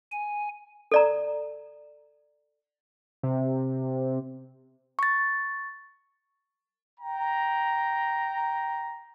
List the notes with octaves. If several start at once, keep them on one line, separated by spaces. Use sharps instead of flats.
G#5
A4 D5 A#5
C3
C#6 A6
G5 A#5